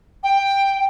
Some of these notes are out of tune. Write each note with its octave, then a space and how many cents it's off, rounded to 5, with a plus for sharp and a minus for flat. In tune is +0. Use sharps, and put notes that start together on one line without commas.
G5 +10